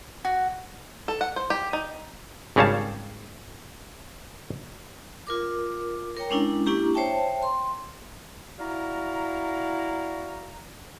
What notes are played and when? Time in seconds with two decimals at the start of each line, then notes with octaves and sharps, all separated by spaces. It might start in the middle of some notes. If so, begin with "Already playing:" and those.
0.25 F#4
1.08 A4
1.21 F#5
1.36 C5
1.50 G4
1.73 D#4
2.56 G#1 C#3 G3 C#5 F5 A5
5.27 F4 A#4 D6
6.17 A#4 C#5 G5 A#5
6.30 G#3 C#4 D4 E4
6.65 A#3 D4 E4 G4 A#5 C#6
6.94 C5 C#5 E5 G5 A5
7.43 C6
8.59 E4 F#4 D5 F5 A#5